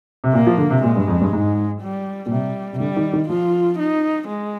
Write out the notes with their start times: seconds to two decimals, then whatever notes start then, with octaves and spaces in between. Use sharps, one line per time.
0.24 C3
0.34 A#2 A#3
0.47 F3
0.58 D3
0.70 C3
0.83 A#2 G#3
0.96 G2
1.08 F2
1.21 G2
1.33 G#2
1.82 G3
2.26 A#2
2.30 C3 G3
2.73 C3
2.80 D3 G3
2.96 D#3
3.13 D#3
3.29 F3 F4
3.79 D#4
4.29 G#3